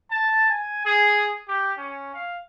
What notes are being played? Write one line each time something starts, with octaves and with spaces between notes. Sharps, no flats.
A5
G#5
G#4
G4
C#4
F5